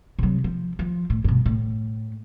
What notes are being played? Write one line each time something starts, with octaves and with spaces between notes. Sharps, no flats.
C3 F#3
F3
F3
A2
G2 B2
A2